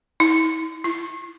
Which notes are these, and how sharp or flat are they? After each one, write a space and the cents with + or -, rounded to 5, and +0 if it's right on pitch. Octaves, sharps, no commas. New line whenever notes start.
E4 -40
E4 +45